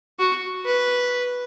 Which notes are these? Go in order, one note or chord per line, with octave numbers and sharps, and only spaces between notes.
F#4
B4